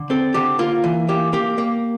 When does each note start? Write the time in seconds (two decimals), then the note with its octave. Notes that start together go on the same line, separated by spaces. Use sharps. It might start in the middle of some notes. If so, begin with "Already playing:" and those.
Already playing: D3
0.10 C4 A4
0.34 D3 G4
0.59 A#3 F4
0.84 E3
1.09 A#3 G4
1.33 A#3 G4
1.58 A#3